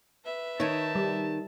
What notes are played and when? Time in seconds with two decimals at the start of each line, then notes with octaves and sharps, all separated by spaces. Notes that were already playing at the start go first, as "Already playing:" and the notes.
0.25 B4 E5
0.60 D#3 D#4 C#5 A5
0.95 G3